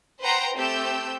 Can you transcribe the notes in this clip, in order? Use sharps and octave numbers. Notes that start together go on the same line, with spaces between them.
B4 C5 F#5 G5 A#5 C6
A3 C4 G4 A4 E6 G6